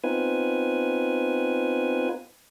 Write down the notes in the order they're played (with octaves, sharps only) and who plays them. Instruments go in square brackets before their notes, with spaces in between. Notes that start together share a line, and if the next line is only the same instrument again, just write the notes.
[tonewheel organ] B3 C4 D#4 F4 B4 G#5